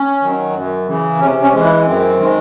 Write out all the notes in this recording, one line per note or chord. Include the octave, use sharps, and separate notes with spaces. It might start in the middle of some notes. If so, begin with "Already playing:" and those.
Already playing: C#4
D#3 F#3
F#2
C#3 E3
C3 C#4
C#4
E3 G#3
E4
F#2 C4
D#3 G#3